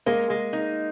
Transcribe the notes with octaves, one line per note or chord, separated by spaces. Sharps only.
G#3 A#3
G#3
D#4